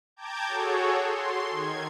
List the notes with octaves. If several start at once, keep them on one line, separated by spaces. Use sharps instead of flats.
G5 A5 A#5 D6 G6 G#6
F#4 G#4 A4 C#5
C6
D#3 G#6